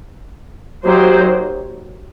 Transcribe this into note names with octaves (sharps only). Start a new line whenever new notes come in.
F#3 A#3 D#4 G4 C5